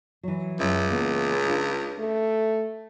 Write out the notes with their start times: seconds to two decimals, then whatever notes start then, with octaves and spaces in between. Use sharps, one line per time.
0.23 E3 F#3
0.60 C#2 F#2 C#5 E5
0.91 C#3 E3 A#3 B3
1.45 D4 F4
1.99 A3